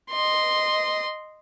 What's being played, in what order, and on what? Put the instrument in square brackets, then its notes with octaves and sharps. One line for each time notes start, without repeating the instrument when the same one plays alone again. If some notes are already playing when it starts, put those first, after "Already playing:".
[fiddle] D#5 C6